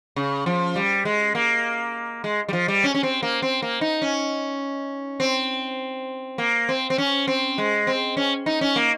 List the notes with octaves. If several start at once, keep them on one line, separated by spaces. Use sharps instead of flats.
C#3
F3
G3
G#3
A#3
G#3
G3
F3
G3
C#4
C#4
C4
A#3
C4
A#3
D#4
C#4
C4
A#3
C4
C4
C#4
C4
G#3
C4
C#4
D#4
C#4
A#3